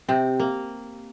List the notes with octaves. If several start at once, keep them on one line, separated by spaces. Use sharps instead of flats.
C3 C4
A#3